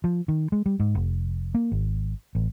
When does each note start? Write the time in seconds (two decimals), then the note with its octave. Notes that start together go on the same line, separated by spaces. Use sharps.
0.04 F3
0.28 D#3
0.52 G#3
0.66 G3
0.80 G#2
0.95 F1
1.54 A#3
1.72 G#1
2.35 A1